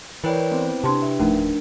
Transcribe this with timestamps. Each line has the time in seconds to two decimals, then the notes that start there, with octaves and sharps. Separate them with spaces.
0.24 E3 E4 A#4 B4 C#5 D5 G5
0.51 B3 C4 C5
0.84 C3 D4 G4 A5 C6
1.03 E5
1.20 D1 F3 A3 D4 D#4 A#4